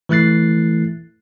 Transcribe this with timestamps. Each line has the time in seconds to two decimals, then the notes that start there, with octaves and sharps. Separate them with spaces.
0.09 E3 A3 E4 F#6 A6 C7